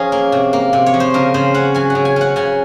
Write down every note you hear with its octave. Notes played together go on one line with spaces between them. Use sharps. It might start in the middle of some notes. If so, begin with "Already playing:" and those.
Already playing: F3 C#4 G#4 A#4 C#5 F5
A#3
C3
A#3
C3
C#5
F3
C5
C#3 A#4
C#3 C5
C#4 F#5
F#3 G#5
F#5
C#3
G#5
C#4 F#5
C#3 G#5